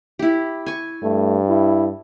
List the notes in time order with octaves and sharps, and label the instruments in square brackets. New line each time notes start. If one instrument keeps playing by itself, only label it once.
[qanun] E4 G4
G#5 C#6
[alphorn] G2 [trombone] A3
[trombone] E4